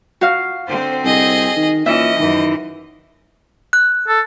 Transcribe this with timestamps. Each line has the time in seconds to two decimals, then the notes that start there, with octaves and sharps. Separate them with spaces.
0.21 F#4 F5
0.68 D3 C4 C5
1.05 C2 G#4 D#5
1.56 D#3
1.86 A#2 E3 C#4 D#5 E5
2.19 F#2 D#3 E3
3.73 F#6
4.08 A4